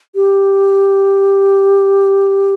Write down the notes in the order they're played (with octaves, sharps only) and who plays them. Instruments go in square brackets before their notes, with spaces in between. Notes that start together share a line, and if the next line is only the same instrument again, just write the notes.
[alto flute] G4